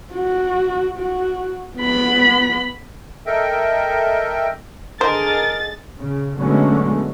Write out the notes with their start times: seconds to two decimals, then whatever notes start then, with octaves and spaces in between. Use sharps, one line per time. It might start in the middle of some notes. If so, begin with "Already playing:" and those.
0.13 F#4
0.99 F#4
1.78 B3 B5
3.26 A4 A#4 D#5 E5 G5
5.01 D3 G#4 A#4 C5 D#5 A6
5.98 C#3
6.40 D3 F#3 G#3 A3 B3 C#4